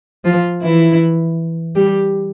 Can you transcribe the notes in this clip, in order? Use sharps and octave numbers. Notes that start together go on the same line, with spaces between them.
F3 F4
E3 E4
G3 G4